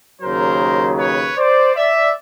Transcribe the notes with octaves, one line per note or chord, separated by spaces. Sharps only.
D#2 C#3 F#3 A#4 C5
B4 C#5
C5 D5
D5 E5